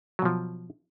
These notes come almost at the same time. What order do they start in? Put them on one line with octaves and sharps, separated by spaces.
F#3 B2 F3